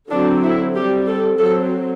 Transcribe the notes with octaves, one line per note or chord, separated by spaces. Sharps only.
D3 F#3 C4 D4
E4
G3 C4 G4
A4
F#3 C4 A4